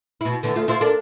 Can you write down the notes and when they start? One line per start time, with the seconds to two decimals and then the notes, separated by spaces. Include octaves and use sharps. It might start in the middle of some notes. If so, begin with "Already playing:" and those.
0.21 B2 E4
0.43 D3 E3 B3
0.56 D2 A3 F4
0.68 E4 F4 C5
0.81 D4 A4 A#4